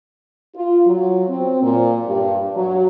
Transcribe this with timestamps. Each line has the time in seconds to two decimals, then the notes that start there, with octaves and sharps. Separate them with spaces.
0.56 F4
0.87 F#3
1.29 C4
1.63 A#2
2.07 G2
2.56 F#3